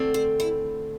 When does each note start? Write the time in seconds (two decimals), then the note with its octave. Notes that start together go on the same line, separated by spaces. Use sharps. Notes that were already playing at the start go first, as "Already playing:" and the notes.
Already playing: D3 A3 C4
0.14 C5
0.40 E4